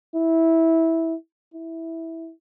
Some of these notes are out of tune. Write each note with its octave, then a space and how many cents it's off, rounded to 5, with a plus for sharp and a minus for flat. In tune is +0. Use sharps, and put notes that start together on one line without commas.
E4 -10
E4 -10